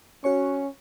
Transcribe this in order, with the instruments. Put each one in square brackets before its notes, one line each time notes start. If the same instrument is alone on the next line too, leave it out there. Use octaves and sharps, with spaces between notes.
[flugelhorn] C#4 [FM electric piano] F#4 C#5 C#6